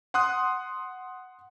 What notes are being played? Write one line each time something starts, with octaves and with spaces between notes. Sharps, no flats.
F#5 C6 D#6 F#6